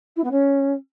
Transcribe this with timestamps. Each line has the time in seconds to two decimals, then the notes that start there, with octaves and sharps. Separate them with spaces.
0.16 E4
0.24 B3
0.31 C#4